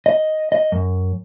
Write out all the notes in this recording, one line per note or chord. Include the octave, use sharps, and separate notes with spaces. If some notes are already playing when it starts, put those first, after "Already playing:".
D#5
D#5
F#2